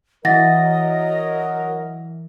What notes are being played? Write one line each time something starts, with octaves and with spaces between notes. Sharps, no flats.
E3 F#3 A#4 D#5 F#5 A6 A#6